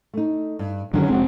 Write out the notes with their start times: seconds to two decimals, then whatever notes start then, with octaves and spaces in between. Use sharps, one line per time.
0.14 A3 D#4
0.59 G2
0.93 F#2 D3 D#3 F#3 C#4 G#4
1.09 F1 G#3 C4 F#4